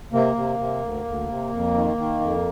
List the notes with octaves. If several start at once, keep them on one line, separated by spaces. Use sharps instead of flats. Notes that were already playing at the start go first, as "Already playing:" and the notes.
C3 A#3
C3
C3
D2
D2
C3
F2
D#3
D#3
F2